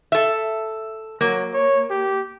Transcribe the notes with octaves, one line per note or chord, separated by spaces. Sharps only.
A4 E5
F#3 A#3
C#5
G4